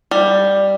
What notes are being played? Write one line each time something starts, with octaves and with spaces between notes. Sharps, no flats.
G3